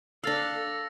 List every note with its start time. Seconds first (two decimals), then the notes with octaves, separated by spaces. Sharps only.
0.24 D4 A4 F5 E6 A6 A#6